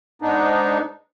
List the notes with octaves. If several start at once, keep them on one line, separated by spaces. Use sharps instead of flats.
G#2 B3 D4 D#4